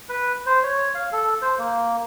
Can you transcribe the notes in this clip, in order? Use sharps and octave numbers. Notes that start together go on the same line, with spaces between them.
B4
C5
C#5
F5
A4
C5
A#3